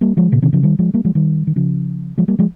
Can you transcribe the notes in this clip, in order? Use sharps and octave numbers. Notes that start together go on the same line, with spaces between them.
G3 A#3
F3 G#3
A#2 C#3
C3 D#3
C#3 F3
D#3 G3
F3 G#3
G3 A#3
F3 G#3
D#3 G3
D#3
C#3 F3
F3 G#3
G3 A#3
F3 G#3